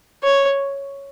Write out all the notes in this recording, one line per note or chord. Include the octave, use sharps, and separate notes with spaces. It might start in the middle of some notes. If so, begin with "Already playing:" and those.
C#5